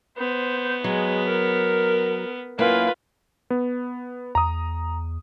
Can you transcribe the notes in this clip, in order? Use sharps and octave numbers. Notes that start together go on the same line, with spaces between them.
B3 C5
F#3 G#3
A#4
F#2 A#3 E4 F4 B4
B3
E2 A#5 D#6